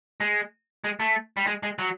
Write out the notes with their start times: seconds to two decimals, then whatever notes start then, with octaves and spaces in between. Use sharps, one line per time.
0.20 G#3
0.84 G#3
1.00 A3
1.37 G3
1.47 G#3
1.63 G#3
1.79 F#3